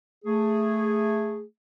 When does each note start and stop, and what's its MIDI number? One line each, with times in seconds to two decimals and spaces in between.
0.25 1.42 57
0.25 1.42 68